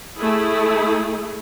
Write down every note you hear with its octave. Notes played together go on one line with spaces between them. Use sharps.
A3 E4 G#4